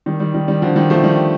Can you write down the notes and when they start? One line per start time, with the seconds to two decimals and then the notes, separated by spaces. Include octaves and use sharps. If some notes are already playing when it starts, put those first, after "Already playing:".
0.06 D#3 G3
0.20 D#3 G3
0.34 D#3 G3
0.48 D#3 G3
0.62 D3 F3
0.76 D#3 G3
0.90 F3 A3
1.04 D#3 G3